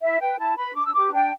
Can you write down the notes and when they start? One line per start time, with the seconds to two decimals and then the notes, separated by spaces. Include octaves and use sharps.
0.02 E4 E5
0.20 B4 G5
0.39 E4 A5
0.57 B4 B5
0.76 D4 D6
0.86 E6
0.94 G4 B4 D6
1.13 D4 G5